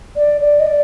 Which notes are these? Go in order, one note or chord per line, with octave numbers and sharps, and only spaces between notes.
D5
D5
D#5
D5